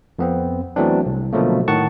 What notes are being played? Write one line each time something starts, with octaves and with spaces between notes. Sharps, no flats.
F2 B3 C4
E3 F#3 A3 B3 C4 D4
C2
B2 D3 F3 F#3 A3 A#3
A2 D#3 F#5 A5 C#6